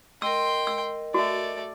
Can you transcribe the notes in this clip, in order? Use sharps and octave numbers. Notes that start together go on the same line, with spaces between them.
A#4 D#5 G5 C6 E6
E6
A3 F#4 D5